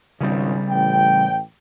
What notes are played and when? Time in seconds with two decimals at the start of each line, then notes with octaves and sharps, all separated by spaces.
0.21 G#1 C#2 C#3 G3
0.70 A1 G5